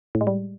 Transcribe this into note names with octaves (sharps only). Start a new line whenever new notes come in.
A2
G#3
G3